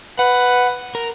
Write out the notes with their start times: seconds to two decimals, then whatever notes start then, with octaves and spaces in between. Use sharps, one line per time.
0.19 B4 F#5
0.95 A#4